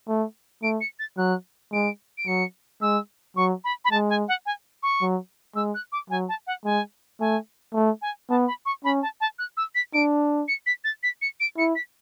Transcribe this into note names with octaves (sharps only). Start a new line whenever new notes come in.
A3
A3 D7
C#7
A6
F#3 F#6
G#3 D7
D7
F#3 C#7
G#3 E6
F#3 C#6
B5
B5
G#3 A5
G#5
F#5
G#5
C#6
F#3
G#3 E6
F#6
D6
F#3 G#5
A5
F#5
G#3 G#5
A3 G#5
A3
G#5
B3 A5
B5
C#6
C#4 B5
A5
A5
F#6
E6
B6
D4 D7
C#7
B6
A6
B6
C#7
D7
E4 C#7
B6